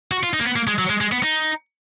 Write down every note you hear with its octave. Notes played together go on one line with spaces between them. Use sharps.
F#4
F4
D#4
A#3
B3
A#3
G#3
F#3
G#3
G#3
B3
D#4